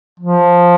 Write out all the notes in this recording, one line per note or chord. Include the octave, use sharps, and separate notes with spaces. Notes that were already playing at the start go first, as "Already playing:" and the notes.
F3